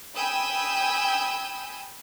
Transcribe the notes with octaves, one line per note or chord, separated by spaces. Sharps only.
G5 G#5 B5 D#6 E6 G6